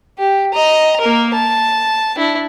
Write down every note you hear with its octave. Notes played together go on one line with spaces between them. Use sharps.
G4
D#5 A#5
A#3 A#4
A5
D4 E4